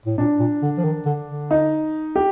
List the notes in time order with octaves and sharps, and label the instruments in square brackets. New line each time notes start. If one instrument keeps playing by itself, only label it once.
[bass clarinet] A2
[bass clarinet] A#2 [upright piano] D4
[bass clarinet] A#2
D3
F3
D#3
D3
D3
[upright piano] D#4
G4